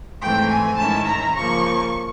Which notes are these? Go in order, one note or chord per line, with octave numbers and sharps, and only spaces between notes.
G#2 E3 A3 C4 G5
G#5
G#2 D#3 G#3 C#4 E4 A5
A#5
C#3 F3 A#3 C#6